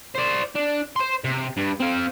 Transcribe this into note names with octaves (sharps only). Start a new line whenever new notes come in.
C5 D5
D4
C5 C6
C3
G2
C4 F5